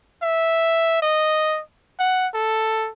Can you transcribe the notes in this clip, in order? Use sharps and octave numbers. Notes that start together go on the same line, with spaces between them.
E5
D#5
F#5
A4